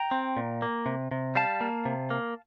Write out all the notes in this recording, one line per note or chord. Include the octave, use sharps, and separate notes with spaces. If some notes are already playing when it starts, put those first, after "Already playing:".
Already playing: G5 A#5
C4
A#2
A#3
C3
C3
G3 F5 A5
A#3
C3
A#3